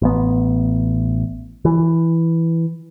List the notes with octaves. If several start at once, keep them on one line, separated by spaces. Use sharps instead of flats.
A1 B3
E3